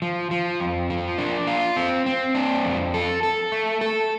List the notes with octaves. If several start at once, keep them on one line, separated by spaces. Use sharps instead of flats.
F3
F3
F2
F3
D4
F4
C4
C4
D4
F2
A4
A4
A3
A4